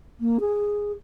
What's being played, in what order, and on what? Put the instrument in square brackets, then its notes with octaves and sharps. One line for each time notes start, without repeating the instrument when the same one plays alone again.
[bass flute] A#3
G#4